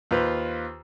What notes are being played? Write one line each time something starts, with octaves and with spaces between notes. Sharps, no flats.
D#2 F4 B4 C5